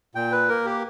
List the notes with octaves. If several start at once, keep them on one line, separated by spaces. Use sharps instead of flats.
A#2 G5
B4
A#3 A#4
G4